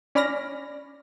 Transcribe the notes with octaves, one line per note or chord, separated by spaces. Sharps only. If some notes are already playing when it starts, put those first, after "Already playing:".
C#4 D5 B5 F6 A#6